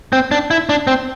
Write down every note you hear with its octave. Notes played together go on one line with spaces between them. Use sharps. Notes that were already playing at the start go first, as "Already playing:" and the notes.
C4
D4
E4
D4
C4